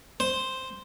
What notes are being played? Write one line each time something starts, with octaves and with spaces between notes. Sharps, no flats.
C5